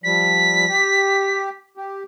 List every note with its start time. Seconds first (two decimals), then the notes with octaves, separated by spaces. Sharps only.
0.04 F3 G3 B6
0.68 G4
1.77 G4